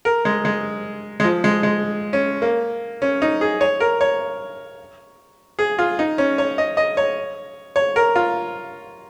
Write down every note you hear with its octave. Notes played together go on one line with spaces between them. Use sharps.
A#4
G#3
G#3
G#3
F3
G#3
G#3
C#4
A#3
C#4
D#4
G#4
C#5
A#4
C#5
G#4
F4
D#4
C#4
C#5
D#5
D#5
C#5
C#5
A#4
F4